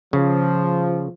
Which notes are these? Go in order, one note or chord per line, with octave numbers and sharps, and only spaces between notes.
C#3 F3